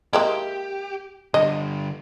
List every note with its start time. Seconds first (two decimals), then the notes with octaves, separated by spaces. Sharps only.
0.13 G#3 A#3 E4 G4
1.34 D3 G3 D#5